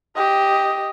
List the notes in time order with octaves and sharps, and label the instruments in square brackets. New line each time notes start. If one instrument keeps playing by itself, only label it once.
[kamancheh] G4 D#5